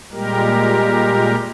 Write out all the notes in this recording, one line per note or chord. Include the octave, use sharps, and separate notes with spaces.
A#2 G3 G#3 G4 A#4